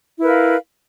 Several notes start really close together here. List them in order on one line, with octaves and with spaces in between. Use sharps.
E4 B4 A#4 F5